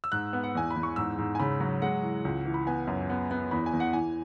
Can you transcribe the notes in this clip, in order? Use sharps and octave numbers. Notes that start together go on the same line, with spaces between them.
E6
G#2 F#6
B3
F#5
E2 G#5
B5
E2
C#6
G#2 E6
G#2
G#5
C#3 B5
F#3
G#3 F#5
E3
C#2
E3
B5
B3 G#5
F#2
B3
B3
E2 B5
G#5
E2
F#5
E3 G#5